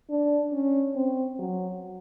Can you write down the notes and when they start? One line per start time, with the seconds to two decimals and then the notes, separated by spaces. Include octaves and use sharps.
0.10 D4
0.53 C#4
0.96 C4
1.39 F#3